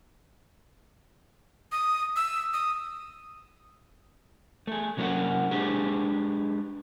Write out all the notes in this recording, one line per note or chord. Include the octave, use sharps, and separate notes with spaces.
D#6
E6
D#6
A3 G#4
C3 F#3 A#3 C4 C#4 F#4
G#3 D4 G4 G#4